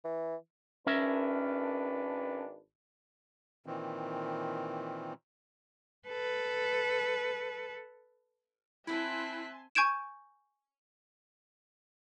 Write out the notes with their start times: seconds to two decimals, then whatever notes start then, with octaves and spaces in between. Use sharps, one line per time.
0.05 E3
0.87 G#1 C#4 D4 A#4 B4 E5
3.66 A#2 D#3 E3 C4
6.08 A4 B4
8.87 C4 E4 E5 G#5 A5 C6 F#6 B6
9.75 G#5 C#6 G6 G#6 D7 E7